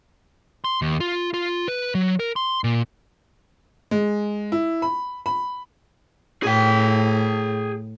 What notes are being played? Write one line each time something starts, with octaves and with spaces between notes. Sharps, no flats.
C6
D#2
F4
F4
B4
F#3
A#4
C6
A#2
G#3
E4
B5
B5
A2 G#4 G5